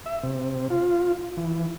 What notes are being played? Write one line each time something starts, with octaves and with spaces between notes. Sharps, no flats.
E5
C3
F4
E3